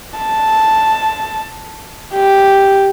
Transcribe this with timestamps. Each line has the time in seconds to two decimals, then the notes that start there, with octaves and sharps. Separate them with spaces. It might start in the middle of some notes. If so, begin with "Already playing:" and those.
0.18 A5
2.14 G4